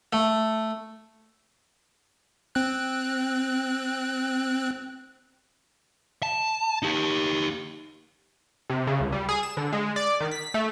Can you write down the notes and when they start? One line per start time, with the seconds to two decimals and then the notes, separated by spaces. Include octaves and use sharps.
0.13 A3
2.55 C4 F#6
6.23 A5
6.83 D#4 G4
8.70 C3
8.87 C#3
9.00 C#2
9.12 G3
9.29 G#4
9.43 E7
9.57 D3
9.72 G#3
9.96 D5
10.20 D#3
10.31 B6
10.54 A3